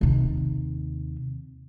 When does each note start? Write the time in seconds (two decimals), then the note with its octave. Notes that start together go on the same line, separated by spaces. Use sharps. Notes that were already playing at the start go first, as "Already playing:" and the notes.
0.01 D#2 C3